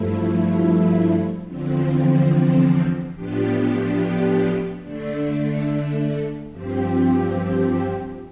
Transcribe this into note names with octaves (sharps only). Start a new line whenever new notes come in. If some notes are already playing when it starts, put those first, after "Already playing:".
Already playing: G2 F3 A3 E4
E2 D3 F3 C4
A2 F3 B3 D4 G4
D3 A3 D4
G2 F3 C4 G4